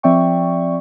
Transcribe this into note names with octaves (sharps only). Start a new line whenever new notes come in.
F3 C4 D5 E5 G5 C#6